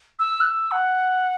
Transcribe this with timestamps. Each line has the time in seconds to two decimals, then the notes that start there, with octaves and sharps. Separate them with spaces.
0.19 E6
0.41 F#6
0.45 E6
0.71 F#5